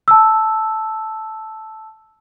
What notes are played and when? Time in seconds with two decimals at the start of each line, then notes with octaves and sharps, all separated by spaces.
0.08 A5 E6